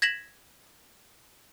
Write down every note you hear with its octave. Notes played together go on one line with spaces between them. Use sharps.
G#6 A#6 B6 E7 F#7